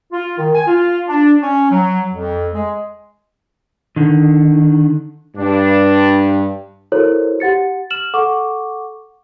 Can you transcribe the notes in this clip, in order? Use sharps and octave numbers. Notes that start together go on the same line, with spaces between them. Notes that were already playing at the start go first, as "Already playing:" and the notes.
F4
D#3
G#5
F4
D4
C#4
F#3
F2
G#3
D3 D#3
G2 D4
E4 F#4 A4 A#4 C5 C#5
G4 F#5 A6 C#7
F6 E7 F#7
A4 F#5 C#6 D6